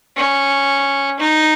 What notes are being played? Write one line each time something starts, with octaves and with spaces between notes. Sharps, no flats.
C#4
D#4